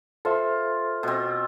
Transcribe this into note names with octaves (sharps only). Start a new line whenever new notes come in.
F4 A4 C5 E5
B2 C4